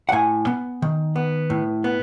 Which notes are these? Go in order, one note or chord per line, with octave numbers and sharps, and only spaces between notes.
F#5
A2 G#5
B3
D#3
B3
A2
B3